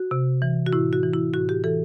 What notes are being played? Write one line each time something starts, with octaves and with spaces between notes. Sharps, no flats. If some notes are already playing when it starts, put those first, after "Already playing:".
Already playing: F#4
C3
E3
F#4
A2 E4
F#4
E3
E4
A2 F#4
G4
E3 A4